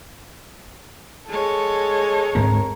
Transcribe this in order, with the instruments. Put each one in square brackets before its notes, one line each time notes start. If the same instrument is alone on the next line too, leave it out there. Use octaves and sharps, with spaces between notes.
[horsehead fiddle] G#3 C#5 [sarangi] A4
[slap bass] D2 G#2 C4 [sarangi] A#4